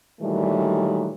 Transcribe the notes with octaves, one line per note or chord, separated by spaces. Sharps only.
A#2 D#3 E3 F#3 G3 A3